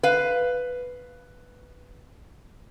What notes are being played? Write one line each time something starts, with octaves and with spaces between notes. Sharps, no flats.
B4 F5